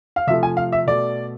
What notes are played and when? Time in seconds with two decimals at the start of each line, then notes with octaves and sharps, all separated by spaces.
0.16 F5
0.27 C3 E5
0.30 F3 A3
0.43 G#5
0.57 F5
0.72 E5
0.87 B2 A3 D5